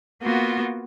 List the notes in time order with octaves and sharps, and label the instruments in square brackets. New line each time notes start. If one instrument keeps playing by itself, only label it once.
[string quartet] A#3 B3 F4 F#4